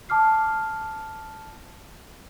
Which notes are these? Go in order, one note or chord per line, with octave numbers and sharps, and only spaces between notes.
A5 D6 F6 C7